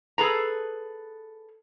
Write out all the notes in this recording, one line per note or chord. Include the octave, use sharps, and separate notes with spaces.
G#4 A4 B4 A#5